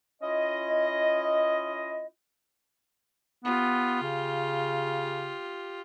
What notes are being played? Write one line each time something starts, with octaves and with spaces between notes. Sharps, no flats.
C#4 E4 F4 D#5
B3 F4 G4
C#3